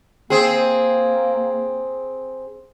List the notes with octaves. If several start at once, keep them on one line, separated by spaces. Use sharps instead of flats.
A#3 C4 G#4